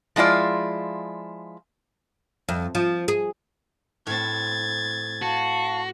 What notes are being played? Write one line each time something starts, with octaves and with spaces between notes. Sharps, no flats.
F3 G#3 E4 F4 D5
F2
F3
G#4
A2 C4 G#6 A6
F#4 F5 A5 C#6